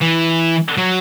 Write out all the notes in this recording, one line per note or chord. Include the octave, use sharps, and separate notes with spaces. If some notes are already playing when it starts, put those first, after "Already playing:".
E3
F#3